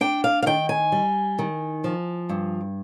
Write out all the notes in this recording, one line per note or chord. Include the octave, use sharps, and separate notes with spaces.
D4 G5
F5
F5
D#3 G5
G#5
G3
D#3
F3
G2